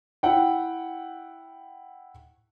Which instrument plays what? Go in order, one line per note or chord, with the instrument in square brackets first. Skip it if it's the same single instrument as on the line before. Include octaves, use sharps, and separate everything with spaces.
[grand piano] E4 F#5 G5